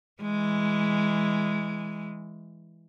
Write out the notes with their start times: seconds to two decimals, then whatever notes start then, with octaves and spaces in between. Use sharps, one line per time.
0.22 E3 G#3